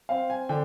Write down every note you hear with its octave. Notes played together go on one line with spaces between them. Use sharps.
C4 F5
G#5
D3 G5